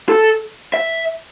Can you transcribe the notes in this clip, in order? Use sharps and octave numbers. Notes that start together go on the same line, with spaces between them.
A4
E5